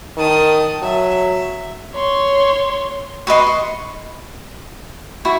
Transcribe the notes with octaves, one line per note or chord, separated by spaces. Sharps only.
D#3 A5 D#6
F#3 E5
C#5 C6
F#4 B4 D#5 C6
C#6
E4 F#4